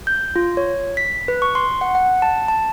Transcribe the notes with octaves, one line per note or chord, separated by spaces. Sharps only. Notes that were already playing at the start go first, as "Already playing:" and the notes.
G6
F4
C#5
B6
B4
C#6
C6
F#5
F#5
A5
A5